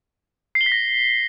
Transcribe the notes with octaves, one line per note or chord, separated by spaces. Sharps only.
C7
G7
B6
A#6